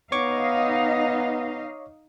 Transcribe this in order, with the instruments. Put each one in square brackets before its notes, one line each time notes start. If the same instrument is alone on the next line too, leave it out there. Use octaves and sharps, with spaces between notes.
[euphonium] B3 [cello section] D#4 D#5 F5 [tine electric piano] C#5 C#6 D6